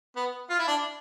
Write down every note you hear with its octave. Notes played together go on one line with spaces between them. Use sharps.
B3
F4
E4
D4